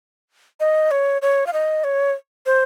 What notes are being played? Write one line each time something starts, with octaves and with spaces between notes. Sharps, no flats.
D#5
C#5
C#5
F5
D#5
C#5
C5